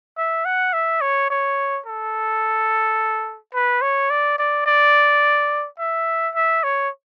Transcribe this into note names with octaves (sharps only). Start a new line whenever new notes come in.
E5
F#5
E5
C#5
C#5
A4
B4
C#5
D5
D5
D5
E5
E5
C#5